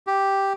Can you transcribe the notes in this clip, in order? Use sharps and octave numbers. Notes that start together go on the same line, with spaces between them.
G4